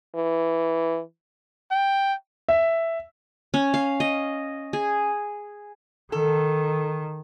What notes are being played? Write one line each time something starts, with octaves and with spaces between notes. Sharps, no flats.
E3
G5
E5
C#4
F5
D#5
G#4
D#3 A4